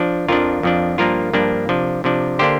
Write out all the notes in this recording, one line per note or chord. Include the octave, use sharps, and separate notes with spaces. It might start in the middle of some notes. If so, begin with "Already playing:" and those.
Already playing: F3 D4
F2 F3 D4 F4 A#4
F2 F3 D4
G2 F3 A#3 D4 F4 A#4
G2 F3 A#3 D4
C3 F3 D4
C3 F3 D4
D3 A#3 D4 G4 C5